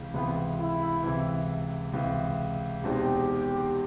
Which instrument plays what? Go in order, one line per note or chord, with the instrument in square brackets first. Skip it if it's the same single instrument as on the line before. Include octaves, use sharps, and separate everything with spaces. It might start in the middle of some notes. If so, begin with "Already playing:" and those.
Already playing: [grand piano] C#2 C3 E3
[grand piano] C#2 C3 E3 [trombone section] B3
[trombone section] E4
[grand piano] C#2 C3 E3
C#2 C3 E3
[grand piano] E2 B2 G#3 C4 D#4 [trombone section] G4